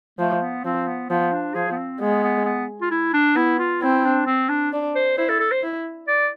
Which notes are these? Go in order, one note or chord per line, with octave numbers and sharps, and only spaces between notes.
F3 A3
B3
F3 C4
B3
F3 B3
D4
F3 G#4
B3
C4
G#3 B3
B3
B3
F4
E4
D4
B3 E4
F4
C4 E4
D4
C4
D4
D4
C5
E4 C5
A4
A4
C5
E4
D5